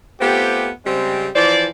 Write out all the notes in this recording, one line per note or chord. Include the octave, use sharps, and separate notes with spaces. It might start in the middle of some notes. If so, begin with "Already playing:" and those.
A3 B3 C4 F4 G4
C#3 G3 G#3 C4
E3 F3 C5 D5